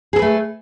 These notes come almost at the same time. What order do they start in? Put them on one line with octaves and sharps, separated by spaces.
G#4 A4 B4 A3